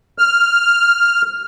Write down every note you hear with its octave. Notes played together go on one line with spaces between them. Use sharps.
F6